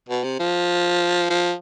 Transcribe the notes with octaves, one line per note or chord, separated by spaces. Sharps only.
B2
C3
F3
F3